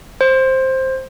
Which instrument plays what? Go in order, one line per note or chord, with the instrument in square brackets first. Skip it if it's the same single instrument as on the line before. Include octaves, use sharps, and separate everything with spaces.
[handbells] C5